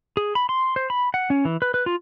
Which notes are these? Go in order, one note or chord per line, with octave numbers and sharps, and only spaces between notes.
G#4
B5
C6
C5
B5
F#5
C#4
E3
B4
B4
F4